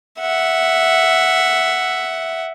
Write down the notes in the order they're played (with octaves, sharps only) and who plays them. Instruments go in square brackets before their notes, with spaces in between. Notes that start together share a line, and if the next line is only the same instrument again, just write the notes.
[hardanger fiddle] E5 F#5